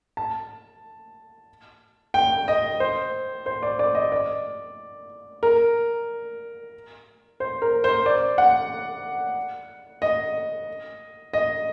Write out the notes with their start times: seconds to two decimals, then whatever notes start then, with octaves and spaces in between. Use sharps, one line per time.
0.17 A5
2.14 G5
2.48 D#5
2.80 C5
3.46 C5
3.63 D5
3.79 D5
3.95 D#5
4.12 D5
5.43 A#4
7.40 C5
7.62 A#4
7.84 C5
8.06 D5
8.38 F#5
10.02 D#5
11.33 D#5